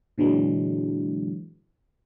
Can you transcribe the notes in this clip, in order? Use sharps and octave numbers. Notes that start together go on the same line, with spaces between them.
A#2 D3 E3 F#3 G#3